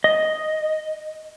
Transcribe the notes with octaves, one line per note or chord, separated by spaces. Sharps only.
D#5